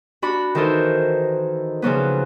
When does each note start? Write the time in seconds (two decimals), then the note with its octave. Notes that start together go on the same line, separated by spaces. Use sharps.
0.22 D4 F#4 B5
0.55 D#3 E3 D#4 A4 A#4 C5
1.82 C#3 F3 F#3 B3